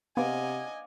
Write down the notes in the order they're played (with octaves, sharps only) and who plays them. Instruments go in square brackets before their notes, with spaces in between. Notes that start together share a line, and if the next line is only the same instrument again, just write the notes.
[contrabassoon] C3 [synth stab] B3 [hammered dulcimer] D5 F5 F#5 [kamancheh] D#5 G#5